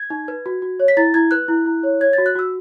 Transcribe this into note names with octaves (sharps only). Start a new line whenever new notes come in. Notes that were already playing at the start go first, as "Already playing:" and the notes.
Already playing: G#6
D#4
B4
F#4
F#4
C#5
B6
E4 A6
E4 G#6
B4 F#6
E4
E4
C#5
C#5 G#6
A6
F#4
F#6
F#4 E6